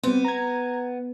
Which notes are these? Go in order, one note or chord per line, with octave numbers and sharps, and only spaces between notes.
G3 B3 C4
A#5 G#6